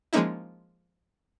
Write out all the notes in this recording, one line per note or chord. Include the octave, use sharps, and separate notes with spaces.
F3 G#3 A#3 C#4 D#4 E4